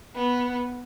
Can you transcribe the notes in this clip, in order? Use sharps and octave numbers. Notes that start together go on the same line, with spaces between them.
B3